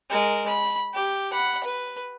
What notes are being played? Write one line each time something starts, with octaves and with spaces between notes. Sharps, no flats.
G#3 A#4
B5
G4
F#5 B5
B4